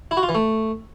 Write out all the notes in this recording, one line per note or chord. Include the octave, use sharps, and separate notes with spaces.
E4
F#4
F4
E3
A3